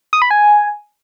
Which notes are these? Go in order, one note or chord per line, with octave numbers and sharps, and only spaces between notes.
D#6
B5
G#5